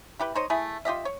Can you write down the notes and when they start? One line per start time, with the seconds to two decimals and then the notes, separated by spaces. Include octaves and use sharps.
0.19 E4 G4 B4
0.35 D#4 C5 C#5 D#5
0.50 A3 E4 G#4
0.85 F4 G4 D#5 E5
1.05 C#5